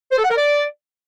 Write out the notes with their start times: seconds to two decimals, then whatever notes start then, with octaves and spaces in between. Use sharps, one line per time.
0.12 C5
0.18 A4
0.24 F#5
0.31 A#4
0.37 D5